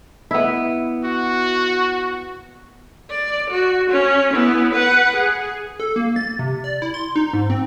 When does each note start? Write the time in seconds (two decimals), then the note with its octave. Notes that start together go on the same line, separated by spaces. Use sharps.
0.31 B3 E4
1.04 F#4
3.10 D5
3.50 F#4
3.90 C#4
4.30 B3 E4
4.73 B4 F#5
5.16 G#4
5.80 A4
5.96 A#3
6.16 A6
6.39 C3
6.64 D5
6.82 E4
6.94 C6
7.16 D#4
7.33 G#2
7.50 C4